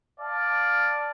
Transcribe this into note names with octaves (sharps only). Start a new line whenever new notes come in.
D5 F5 A5